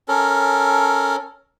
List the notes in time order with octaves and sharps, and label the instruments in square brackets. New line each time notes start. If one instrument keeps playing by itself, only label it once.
[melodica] C#4 A4 A#4